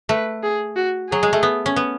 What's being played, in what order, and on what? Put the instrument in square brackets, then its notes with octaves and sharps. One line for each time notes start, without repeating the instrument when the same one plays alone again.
[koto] A3 [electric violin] B4
[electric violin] G#4
F#4
[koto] F#3 [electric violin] G#4
[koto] G#3
A3
B3
C#4
B3